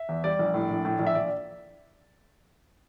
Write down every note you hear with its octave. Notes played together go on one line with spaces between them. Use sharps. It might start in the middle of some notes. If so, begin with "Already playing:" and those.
Already playing: E5
E2
G3 D5
A#1
A2
A#1
A2
A#1
E5
A#1 D5